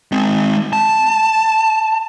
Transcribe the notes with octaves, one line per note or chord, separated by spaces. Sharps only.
G#3 C4
A5